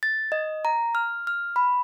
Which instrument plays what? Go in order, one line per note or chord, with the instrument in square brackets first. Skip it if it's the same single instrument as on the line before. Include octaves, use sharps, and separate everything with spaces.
[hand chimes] A6
D#5
A#5
F6
F6
B5